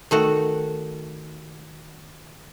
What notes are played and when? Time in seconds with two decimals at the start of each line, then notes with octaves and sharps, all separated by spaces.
0.11 D#3 A3 F#4